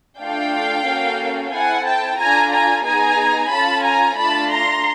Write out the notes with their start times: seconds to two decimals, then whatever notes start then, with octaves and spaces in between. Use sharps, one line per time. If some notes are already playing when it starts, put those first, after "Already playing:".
0.20 A3 D4 F4 A4 F5 G5
0.86 A#3 C#4 F#4 A4
1.52 C4 E4 A4 F#5 G#5
1.86 G5 A5
2.19 D4 F4 A4 G#5 A#5
2.52 G#5 A#5
2.84 B3 D#4 G#4 G#5 A#5
3.50 C#4 F4 A4 A5 B5
3.84 G#5 A#5
4.17 A3 D4 F4 A5 B5
4.50 A#5 C6